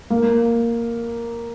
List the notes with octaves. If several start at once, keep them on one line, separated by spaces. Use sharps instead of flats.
A#3